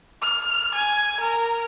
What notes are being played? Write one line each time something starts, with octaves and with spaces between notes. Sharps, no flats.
F6
G#5
A#4